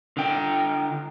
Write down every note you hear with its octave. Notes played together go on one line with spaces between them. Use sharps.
D3 G5